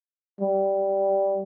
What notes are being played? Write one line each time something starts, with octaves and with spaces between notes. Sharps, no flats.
G3